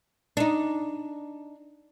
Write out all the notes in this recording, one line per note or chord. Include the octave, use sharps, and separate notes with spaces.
D4 D#4